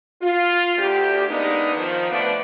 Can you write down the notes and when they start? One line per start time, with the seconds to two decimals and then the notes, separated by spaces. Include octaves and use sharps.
0.21 F4
0.77 D2 G4
1.27 G#3 A#3 B3 D4 D#4
1.74 D#3 F3
2.10 D3 F3 A3 B3 B4 D5